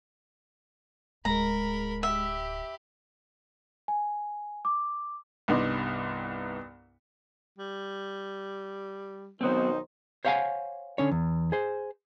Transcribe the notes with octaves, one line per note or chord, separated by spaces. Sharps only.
D1 G#3 A#4 A#5 B5
G4 E5 B5
G#5
D6
C2 G2 B3 D#4 C6 D6
G3
B1 D#3 F#3 B3 C4 D#4 C5
C5 C#5 F5 F#5 G#5
D3 C#4 C#5
E2
G#4 C5